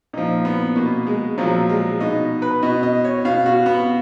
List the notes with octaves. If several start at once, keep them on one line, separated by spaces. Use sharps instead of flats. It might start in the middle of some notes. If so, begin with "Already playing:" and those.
A#2 F3 D#4
B3
B2 A#3
G#3
A#2 F3 F#3
G#3
B2 D#4
B4
B2 D#5
D#5
C#5
B2 F5
F#4
B3